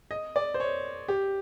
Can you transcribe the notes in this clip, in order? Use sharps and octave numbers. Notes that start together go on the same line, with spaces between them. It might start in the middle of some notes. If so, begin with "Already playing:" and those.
D#5
D5
C5
C#5
G4